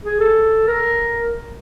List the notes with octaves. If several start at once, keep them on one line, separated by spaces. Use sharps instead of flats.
G#4
A4
A#4